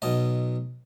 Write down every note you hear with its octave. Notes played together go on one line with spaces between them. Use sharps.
B1 B2 D#5